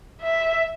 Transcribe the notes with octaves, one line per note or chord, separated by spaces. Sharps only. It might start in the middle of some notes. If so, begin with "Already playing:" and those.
E5